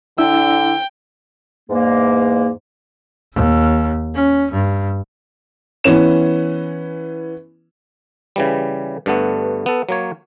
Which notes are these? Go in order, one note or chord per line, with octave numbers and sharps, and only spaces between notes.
D3 D4 E4 G5 E6
E2 G#2 A#3
D#2
C#4
G2
E3 B3 C#4 E7
C#3 E3 G3
G2 D3 A3 B3
B3 A4
F#3 A#3 C#5